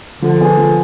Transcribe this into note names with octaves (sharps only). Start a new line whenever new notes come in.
D3 F3
B3 F4 G#4
F3